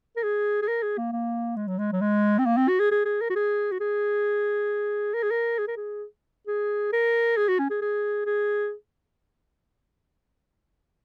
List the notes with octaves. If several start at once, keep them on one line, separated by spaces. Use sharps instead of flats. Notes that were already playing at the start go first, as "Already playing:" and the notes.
A#4
G#4
G#4
A#4
G#4
A#3
A#3
G#3
F#3
G#3
F#3
G#3
C4
A#3
C4
F#4
G#4
G#4
G#4
A#4
F#4
G#4
F#4
G#4
A#4
G#4
A#4
G#4
A#4
G#4
G#4
A#4
G#4
F#4
C#4
G#4
G#4
G#4